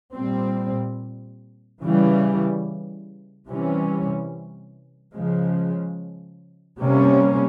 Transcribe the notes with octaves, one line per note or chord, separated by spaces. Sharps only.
A#2 G3 C4
C#3 E3 G3
C3 E3 G3 C#4
C#3 F3 G#3
C3 G3 A#3 C#4